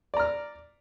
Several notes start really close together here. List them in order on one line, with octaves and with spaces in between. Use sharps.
D5 A#5 F6